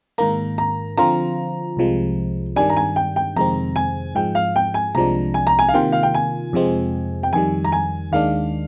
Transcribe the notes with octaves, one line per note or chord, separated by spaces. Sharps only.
G#2 D#3 A#3 A#5
A#5
D3 F3 C4 F4 A#5
C2 C3 F3 G#3
G2 D#3 G3 D4 G#5
A#5
G#5
G5
G5
F2 C3 D#3 G#3 C4 A#5
G#5
G#2 F3 G#3 G5
F5
G5
G#5
C2 C3 F3 G#3 D4 A#5
G#5
A#5
G#5
F5
C3 D#3 A#3 F4 G5
F5
G5
G#5
F2 C3 F3 G#3 C4
G5
F2 D#3 G3 G#5
A#5
G#5
D#2 D#3 G#3 D4 F5